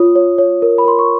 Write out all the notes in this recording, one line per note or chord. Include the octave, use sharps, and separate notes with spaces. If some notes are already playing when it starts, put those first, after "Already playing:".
Already playing: F4 C#5 D#6
C#5
C#5
A#4
B5
A#4 C6
C#6